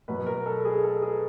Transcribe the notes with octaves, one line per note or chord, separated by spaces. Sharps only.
B2 F#3 B4
A#4
A4
G#4
A4
G#4